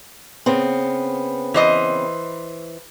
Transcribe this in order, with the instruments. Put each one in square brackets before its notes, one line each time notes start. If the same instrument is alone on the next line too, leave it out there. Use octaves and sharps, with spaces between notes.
[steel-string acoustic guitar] C#3 B3 C4
[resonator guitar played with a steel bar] E3 C5 D#5